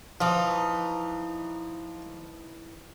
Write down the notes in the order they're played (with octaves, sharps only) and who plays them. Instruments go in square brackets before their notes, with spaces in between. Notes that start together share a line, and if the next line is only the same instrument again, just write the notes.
[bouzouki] E3 D#4 [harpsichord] F3